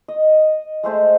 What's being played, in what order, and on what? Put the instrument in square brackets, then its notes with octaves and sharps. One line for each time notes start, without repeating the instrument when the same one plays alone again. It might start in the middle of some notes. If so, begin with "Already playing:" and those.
[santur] D#5
G#3 A3 C5 A5